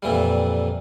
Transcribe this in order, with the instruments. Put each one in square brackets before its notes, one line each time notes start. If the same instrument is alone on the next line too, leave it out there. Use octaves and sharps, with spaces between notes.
[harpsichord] F2 A#2 E3 G3